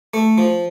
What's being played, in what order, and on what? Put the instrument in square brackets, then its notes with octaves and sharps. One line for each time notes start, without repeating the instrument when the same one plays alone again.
[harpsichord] A3
F3